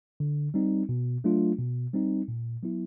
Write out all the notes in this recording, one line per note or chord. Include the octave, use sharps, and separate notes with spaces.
D3
G3 C4 D#4
B2
F#3 A3 D4 F4
B2
G3 C4 D#4
A#2
F#3 B3 E4